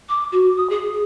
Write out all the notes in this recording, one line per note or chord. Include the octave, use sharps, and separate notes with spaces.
D6
F#4
D#6
G#4